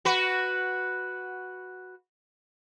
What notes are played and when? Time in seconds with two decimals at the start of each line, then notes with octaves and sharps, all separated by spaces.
0.05 F#4 B4